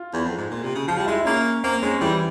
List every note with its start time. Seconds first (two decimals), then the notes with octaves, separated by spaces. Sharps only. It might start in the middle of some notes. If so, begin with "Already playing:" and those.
Already playing: F4
0.13 E2
0.24 F2
0.37 G#2
0.50 A#2
0.62 C3
0.75 C#3
0.88 F3 F4
0.98 G3
1.06 G#3 E4
1.21 E4
1.25 A#3 C#4
1.64 A#3 C4
1.82 G#3 C#4
2.00 E3 G3